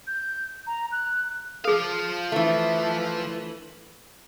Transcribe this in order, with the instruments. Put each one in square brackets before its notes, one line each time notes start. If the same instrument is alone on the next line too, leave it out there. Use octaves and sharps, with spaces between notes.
[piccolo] G6
A#5
F#6
[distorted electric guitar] F3 F5 [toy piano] G#4 A4
[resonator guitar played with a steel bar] E3 A3